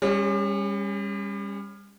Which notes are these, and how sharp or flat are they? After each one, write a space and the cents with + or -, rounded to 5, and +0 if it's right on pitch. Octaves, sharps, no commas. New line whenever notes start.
G3 +35 C#4 -5 G#4 -10